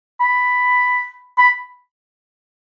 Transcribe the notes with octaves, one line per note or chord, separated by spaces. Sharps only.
B5
B5